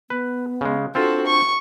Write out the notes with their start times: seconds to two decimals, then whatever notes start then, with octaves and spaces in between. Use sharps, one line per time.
0.10 B3 B4
0.61 C#3 G#3
0.95 C4 D4 F4 F#4 A4 C5
1.26 C#6